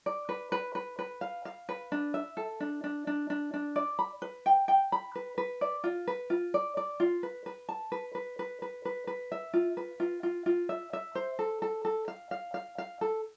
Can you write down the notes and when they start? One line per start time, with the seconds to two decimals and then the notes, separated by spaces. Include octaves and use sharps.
0.06 D5
0.29 B4
0.52 B4
0.75 B4
0.99 B4
1.21 F5
1.45 F5
1.69 B4
1.92 D4
2.14 E5
2.37 A4
2.60 D4
2.84 D4
3.07 D4
3.30 D4
3.54 D4
3.76 D5
3.99 B5
4.22 B4
4.46 G5
4.68 G5
4.92 B5
5.15 B4
5.38 B4
5.61 D5
5.84 F4
6.07 B4
6.30 F4
6.54 D5
6.77 D5
7.00 F4
7.23 B4
7.46 B4
7.69 A5
7.92 B4
8.15 B4
8.39 B4
8.62 B4
8.85 B4
9.07 B4
9.32 E5
9.54 F4
9.77 B4
10.00 F4
10.23 F4
10.46 F4
10.69 E5
10.93 E5
11.15 C5
11.39 A4
11.62 A4
11.85 A4
12.08 F5
12.31 F5
12.54 F5
12.78 F5
13.01 A4